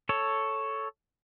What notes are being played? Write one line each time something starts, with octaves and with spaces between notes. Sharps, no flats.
A4 C#5